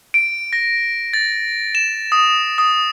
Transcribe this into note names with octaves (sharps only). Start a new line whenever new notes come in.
D7
A#6
A6
E7
D#6
D#6